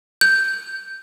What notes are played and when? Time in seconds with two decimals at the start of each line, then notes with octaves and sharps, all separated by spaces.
0.21 G6